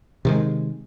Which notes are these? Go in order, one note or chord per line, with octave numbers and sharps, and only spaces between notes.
C3 D#3 G#3